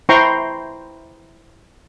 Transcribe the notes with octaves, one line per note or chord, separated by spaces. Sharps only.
E4 C5 G5 A#5 C6 C#6